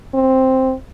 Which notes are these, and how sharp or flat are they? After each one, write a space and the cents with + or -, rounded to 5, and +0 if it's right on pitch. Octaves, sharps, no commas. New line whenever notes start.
C4 +5